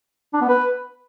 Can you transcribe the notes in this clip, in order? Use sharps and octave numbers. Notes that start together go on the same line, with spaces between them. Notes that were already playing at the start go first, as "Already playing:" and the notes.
D4
B3
B4